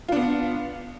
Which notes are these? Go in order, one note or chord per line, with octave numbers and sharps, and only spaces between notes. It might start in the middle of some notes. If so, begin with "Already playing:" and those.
B3 D4 F4